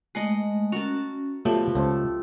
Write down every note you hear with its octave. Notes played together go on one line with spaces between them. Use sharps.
G#3 A3 B4 D#5
C#4 F#4 A#4 A5
B2 F3 F#3 A3 G4 A5
C#2 A3 C5